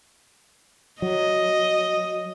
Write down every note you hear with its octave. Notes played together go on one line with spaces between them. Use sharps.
F#3 D#5